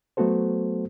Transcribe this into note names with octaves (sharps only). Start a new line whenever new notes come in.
F#3 A3 B3 F#4 A4 C5